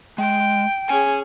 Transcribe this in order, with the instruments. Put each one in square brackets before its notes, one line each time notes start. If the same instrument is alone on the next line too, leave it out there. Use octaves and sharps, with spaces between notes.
[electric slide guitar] G#3 [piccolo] G5
[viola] C#4 G#4 [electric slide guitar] G#5